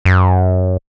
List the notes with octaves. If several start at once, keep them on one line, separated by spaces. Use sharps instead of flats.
F#2